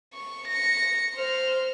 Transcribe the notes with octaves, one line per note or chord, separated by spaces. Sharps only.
C#6
A#6 C#7
C5 F6